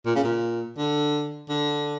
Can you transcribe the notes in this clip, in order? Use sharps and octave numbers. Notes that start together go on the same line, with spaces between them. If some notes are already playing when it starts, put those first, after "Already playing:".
A#2
C#3
A#2
D3
D3